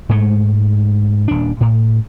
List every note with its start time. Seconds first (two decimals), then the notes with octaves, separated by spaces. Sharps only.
0.09 G#2 G#3 A3
1.28 D#1 D4
1.61 A2